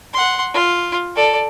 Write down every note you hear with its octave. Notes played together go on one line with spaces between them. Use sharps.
F#5 C6
F4
A4 D5